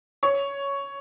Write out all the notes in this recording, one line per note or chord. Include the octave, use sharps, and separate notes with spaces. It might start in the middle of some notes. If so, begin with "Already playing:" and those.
C#5